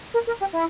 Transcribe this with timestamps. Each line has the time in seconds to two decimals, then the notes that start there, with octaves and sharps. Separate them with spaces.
0.14 A#4
0.27 A#4
0.41 G4
0.53 E4